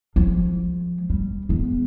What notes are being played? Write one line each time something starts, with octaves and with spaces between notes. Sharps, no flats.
F3 G#3
G3
G#3 B3